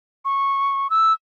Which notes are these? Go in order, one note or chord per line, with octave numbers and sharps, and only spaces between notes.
C#6
E6